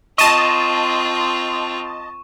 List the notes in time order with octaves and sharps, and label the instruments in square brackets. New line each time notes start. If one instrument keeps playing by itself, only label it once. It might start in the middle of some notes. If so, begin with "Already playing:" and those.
[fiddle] C4 F4 [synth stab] D#5 A5 [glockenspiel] C#6 D#7 E7